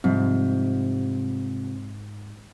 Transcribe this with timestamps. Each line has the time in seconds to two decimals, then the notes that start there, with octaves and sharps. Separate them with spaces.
0.04 G#2 C3 F3 G3 C4